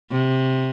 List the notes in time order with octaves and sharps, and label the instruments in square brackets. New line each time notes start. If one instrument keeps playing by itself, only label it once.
[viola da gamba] C3